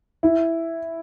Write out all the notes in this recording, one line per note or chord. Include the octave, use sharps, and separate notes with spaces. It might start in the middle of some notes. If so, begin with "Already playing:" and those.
E4